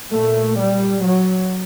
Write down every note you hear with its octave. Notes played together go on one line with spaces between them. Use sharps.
A#2 A3
G3
F#3